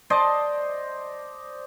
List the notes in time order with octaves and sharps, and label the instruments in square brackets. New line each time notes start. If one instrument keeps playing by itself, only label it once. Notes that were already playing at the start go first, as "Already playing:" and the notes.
[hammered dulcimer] C5 D5 D#5 A5